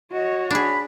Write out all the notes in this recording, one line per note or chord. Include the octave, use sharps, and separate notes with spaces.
F#4 C#5 D#5
D4 G#4 B5